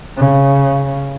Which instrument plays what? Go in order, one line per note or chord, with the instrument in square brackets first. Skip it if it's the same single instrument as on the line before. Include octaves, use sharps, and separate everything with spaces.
[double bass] C#3